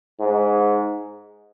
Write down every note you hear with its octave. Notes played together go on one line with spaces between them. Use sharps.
G#2